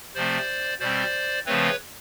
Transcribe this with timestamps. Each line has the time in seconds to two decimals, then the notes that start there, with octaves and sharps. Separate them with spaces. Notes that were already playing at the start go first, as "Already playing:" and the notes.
0.15 C3 F3 A3 C4 C5 D5
0.80 B2 G3 C4 C5 D5
1.46 C#3 F3 A3 C4 B4 C#5